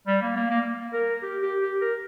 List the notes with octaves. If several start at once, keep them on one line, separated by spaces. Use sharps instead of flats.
G3
A#3
A#3
A#3
A#4
G4
G4
G4
A#4